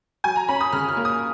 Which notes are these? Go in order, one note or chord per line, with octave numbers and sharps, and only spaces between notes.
F#3 G#5
A#5
C#4 B5
D#6
C#3 F6
F6
A#3
D#6